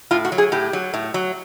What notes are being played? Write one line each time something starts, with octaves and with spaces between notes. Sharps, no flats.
A2 F4
F#4
F#3
G#4
A2 G4
F#3
A2
F#3